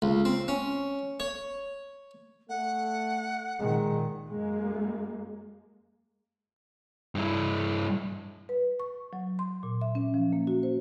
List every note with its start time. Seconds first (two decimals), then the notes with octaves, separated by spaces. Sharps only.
0.02 C#2
0.25 C4
0.48 C#4
1.20 C#5
2.49 A3 F#5
3.59 A#2 D#3 G#3
4.28 F#2 G#3 A#3
7.15 G2 E4
8.49 B4
8.80 C#6
9.13 F#3
9.39 C6
9.63 A#2
9.81 E5
9.95 C#4
10.14 F3
10.33 A#3
10.47 F#4
10.63 C5